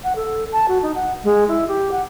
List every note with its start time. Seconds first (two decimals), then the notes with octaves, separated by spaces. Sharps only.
0.04 F#5
0.16 A4
0.52 A5
0.68 F#4
0.82 D#4
0.95 F#5
1.24 G#3
1.48 E4
1.68 G4
1.91 F#5